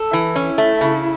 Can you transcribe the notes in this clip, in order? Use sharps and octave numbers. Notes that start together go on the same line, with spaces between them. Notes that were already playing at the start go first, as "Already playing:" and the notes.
Already playing: A4
E3 E4
C#4
A3
C#3